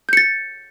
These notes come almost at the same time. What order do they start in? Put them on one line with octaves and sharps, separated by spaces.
G6 C#7 A6